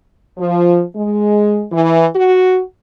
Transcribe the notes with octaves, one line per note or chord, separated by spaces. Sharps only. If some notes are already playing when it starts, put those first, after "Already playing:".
F3
G#3
E3
F#4